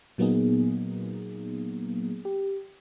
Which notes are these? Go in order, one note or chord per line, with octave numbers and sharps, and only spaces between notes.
A#2 F#3 A#3 B3 D#4 G#4
G4